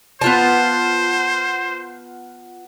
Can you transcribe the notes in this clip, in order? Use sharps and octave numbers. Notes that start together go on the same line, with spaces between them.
B3 F4 C5 A5